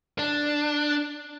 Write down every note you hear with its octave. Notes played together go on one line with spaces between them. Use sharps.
D4